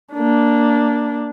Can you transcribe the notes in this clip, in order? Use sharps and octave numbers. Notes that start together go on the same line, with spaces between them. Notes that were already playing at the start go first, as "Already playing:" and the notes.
A#3 D4